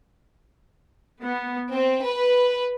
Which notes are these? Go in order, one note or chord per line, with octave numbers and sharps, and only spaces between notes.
B3
C4
B4